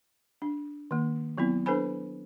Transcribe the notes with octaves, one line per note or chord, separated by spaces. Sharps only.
D4
D#3 A#3
F#3 B3 C4 E4
D4 A4 B4 C5 G#5 B5